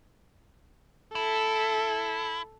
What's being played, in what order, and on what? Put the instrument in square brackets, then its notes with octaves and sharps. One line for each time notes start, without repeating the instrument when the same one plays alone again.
[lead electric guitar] E4 [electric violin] A4